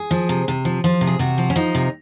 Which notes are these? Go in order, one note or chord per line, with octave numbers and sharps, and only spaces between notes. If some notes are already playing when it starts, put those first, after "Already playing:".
Already playing: G#4
F3
C3
C3
F3
F3
C3
G#4
C3 F#4
F3
C#4
F3 D#4
C3